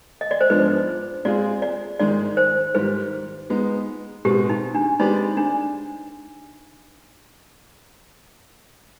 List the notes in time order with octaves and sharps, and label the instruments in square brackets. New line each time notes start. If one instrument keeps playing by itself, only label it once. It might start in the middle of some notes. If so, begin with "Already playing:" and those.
[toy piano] D#5
D5
C5
[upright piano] G#2 F3 G#3 B3 D4 [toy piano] B4
[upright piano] G#3 C4 F4 G#4 [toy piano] D5
[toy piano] D5
[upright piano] G#2 D#3 G#3 [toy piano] D5
[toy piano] C5
[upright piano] G#2 D#3 G3 [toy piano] B4
[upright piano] G#3 B3 D#4
[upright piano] B2 G#3 C4 [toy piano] G4
[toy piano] D#4
D4
[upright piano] G#3 C4 G4 B4 D5 [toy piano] D#4
[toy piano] D4